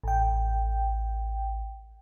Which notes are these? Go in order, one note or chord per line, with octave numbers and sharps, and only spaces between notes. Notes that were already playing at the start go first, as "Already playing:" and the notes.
A1 G5